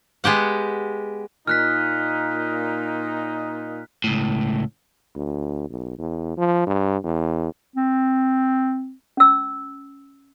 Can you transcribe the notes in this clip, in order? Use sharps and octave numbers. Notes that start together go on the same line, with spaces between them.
G#3 B3 G4 F#5
A#2 D#4 F6 F#6 B6
C#2 A2
D2
B1
E2
F3
G2
E2
C4
C#4 E6